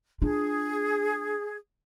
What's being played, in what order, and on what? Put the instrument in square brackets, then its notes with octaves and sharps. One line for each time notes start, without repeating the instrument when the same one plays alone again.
[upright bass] D4 F4 [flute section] G#4